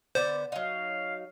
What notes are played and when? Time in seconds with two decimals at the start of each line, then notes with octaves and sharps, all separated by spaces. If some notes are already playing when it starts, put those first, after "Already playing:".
0.15 D3 B3 C5 D5
0.52 F#3 D#4 F5